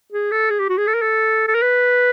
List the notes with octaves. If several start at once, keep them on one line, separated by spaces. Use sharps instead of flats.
G#4
A4
G#4
G4
F#4
G#4
A4
A#4
A4
A4
A#4
B4